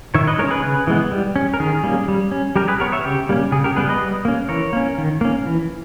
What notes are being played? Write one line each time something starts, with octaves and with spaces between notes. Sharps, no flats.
D#3 C#5 E5
B4 D#5
G#3 A#4 C#5
C#4
G#4 B4
C#3
E3 G#3 B3
G3
C#4
A#4
D#3 G#4
G3 A#3 C#4
G3
C#4
G3 G4 A#4
G#4 B4
B3 A#4 C#5
C#5 E5
C#3 G4
G3 A#3 C#4
C#3 G#4
G4 A#4
G3 B3 G#4 B4
B4 D#5
G3
A#3 C#4
E3 A#4 C#5
A#3 C#4
D#3
A#3 C#4
E3